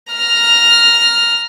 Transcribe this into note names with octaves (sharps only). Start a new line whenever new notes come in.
A#5 F6